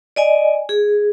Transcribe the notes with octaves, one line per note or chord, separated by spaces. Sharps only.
D5 D#5 G#5
G#4